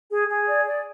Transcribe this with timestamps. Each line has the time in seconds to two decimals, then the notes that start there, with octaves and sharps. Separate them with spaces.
0.11 G#4
0.28 G#4
0.47 D5
0.65 D5